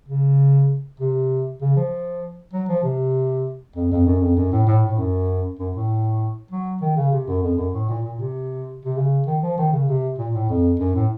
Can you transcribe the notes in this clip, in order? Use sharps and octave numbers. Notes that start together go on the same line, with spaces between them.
C#3
C3
C#3
F3
F#3
F3
C3
F2
F2
F#2
F2
F#2
A2
A2
A2
F#2
F#2
A2
F#3
D#3
C#3
C3
F#2
F2
F#2
A2
A#2
A#2
C3
C3
C#3
D#3
F3
D#3
C#3
C3
A#2
A2
F2
F#2
A2